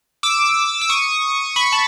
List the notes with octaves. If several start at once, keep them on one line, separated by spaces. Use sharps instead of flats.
D6 E6
E6
C#6 D#6
B5 C#6
A5 B5